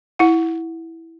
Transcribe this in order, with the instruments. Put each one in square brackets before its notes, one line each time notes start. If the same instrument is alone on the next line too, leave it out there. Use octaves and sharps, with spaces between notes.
[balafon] E4 F#5